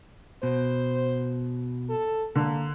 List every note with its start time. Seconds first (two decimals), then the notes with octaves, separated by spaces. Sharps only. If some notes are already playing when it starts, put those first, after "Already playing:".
0.43 B2 C5
1.89 A4
2.35 D3 A#3